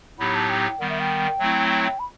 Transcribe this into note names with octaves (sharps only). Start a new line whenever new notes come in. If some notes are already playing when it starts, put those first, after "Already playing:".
A2 F#3 B3 D#4 G4 B5
A5
G5
D#3 G3 B3 F#5
E5
G5
F#3 A3 C4 E4
G5
G5
B5